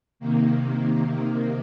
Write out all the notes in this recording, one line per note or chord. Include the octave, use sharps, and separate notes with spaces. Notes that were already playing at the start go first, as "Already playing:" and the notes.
C3 D#3 A#3